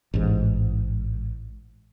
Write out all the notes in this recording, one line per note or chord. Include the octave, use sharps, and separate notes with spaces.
A1 G#2